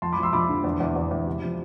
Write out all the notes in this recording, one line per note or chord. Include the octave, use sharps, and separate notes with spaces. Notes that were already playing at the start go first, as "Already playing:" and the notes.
F2 A5 C6
B5 D6
F3 C6 E6
F3 B5 D6
D3
E2
E2
E2
E2
C3
F3